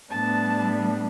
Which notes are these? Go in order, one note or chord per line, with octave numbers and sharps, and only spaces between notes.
A2 G3 B3 D4 A5